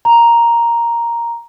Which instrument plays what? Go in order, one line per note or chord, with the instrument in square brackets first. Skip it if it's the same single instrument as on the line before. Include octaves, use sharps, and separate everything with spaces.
[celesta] A#5